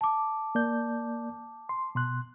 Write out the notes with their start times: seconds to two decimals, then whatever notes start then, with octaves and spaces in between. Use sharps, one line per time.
0.01 A5 D6
0.55 A#3 D5 G6
1.69 C6
1.95 B2 C6 F#6